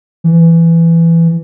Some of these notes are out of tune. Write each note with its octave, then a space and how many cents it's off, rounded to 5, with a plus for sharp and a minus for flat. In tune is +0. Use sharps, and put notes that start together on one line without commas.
E3 +15